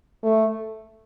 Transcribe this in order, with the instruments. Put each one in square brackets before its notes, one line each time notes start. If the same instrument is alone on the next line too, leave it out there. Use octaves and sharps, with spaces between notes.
[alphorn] A3